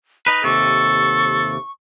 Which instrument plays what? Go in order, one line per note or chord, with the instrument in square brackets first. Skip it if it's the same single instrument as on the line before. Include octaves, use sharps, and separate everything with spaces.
[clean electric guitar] D#4 B4 [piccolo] B5
[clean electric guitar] D#2 C3 [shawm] A4 [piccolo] C#6